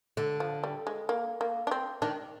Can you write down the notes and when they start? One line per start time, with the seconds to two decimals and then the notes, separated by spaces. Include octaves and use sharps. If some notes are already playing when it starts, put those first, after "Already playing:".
0.17 D3
0.40 F3
0.64 G3
0.87 G#3
1.09 A#3
1.41 A#3
1.67 D4
1.71 C4
2.02 D#3 D4